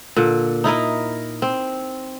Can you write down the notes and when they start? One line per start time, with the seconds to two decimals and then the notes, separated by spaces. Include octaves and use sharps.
0.16 A#2 D3
0.64 D#4 E4 A#4 D#5
1.42 C4